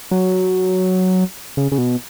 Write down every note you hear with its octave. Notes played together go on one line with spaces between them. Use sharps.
F#3
C#3
C#3
B2